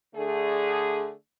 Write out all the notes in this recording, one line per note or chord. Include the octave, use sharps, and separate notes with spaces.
D3 A3 G#4